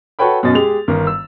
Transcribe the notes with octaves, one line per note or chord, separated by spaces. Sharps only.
F#4 A4 B4 C#5 G5 B5
F#2 B2 C#4 D#5 A6
G#3 G4 G#4 F7
G1 D#3 A#4
E6